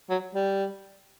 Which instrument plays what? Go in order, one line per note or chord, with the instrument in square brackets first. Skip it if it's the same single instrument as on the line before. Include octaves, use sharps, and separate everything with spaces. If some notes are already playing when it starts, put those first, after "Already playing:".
[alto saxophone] F#3
G3